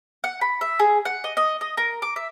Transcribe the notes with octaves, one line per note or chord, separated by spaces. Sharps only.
F#5
B5
E5
G#4
F#5
D#5
D#5
D#5
A#4
D6
E5